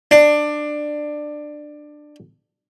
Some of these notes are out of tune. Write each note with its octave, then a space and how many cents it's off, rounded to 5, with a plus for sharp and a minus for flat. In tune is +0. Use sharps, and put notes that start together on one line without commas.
D4 +15